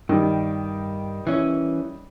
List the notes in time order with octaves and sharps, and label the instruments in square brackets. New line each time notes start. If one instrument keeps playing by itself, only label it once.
[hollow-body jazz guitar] G2 [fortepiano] D#3 G3
[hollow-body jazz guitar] E3 C#4